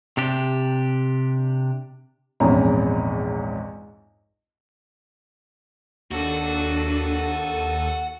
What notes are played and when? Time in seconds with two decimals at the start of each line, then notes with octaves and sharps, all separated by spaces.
0.17 C3 D4 G4
2.40 A#1 E2 G#2 C4 C#4 A#5
6.11 D#2 D4 F#4 A4 D#7